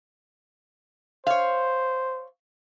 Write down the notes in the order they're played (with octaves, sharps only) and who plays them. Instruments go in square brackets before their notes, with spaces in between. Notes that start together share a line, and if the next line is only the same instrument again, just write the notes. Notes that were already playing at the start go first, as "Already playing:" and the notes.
[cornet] C5 [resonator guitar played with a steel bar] C#5 F5